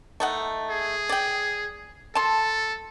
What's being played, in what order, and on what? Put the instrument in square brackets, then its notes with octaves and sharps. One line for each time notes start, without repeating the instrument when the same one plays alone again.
[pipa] A3 D#4 F#5
[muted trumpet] G#4
[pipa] D5 G5
[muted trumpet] A4 [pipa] A5 C6